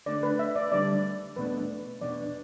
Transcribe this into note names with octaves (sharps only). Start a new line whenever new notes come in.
D3 A3 D4 D5
B4
E5
D5
D2 D3 G3 D4 D5
E2 B2 A3 D4 B4
E2 B2 B3 D4 D5